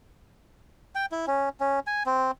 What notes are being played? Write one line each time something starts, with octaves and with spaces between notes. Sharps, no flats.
G5
E4
C#4
C#4
G#5
C4